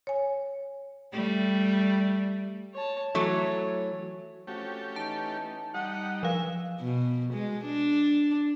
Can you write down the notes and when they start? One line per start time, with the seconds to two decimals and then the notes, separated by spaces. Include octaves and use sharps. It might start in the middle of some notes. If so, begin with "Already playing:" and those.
0.07 C#5 G#5
1.12 G3 A3
2.74 C#5 A5
3.15 E3 F#3 A3 F#4 C#5
4.47 F3 A3 C4 C#4 F#4 G4
4.96 E3 D#4 A5
5.74 G3 D#4 F#5
6.23 F3 D4 G#4 B4 F5 E6
6.81 B2
7.34 G#3
7.65 D4